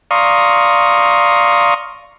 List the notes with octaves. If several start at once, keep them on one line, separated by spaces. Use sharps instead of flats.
D5 F5 A#5 C6 C#6 D#6